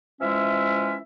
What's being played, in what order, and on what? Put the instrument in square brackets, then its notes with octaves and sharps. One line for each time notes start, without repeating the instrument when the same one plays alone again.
[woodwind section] E3 F3 G#3 C#4 E5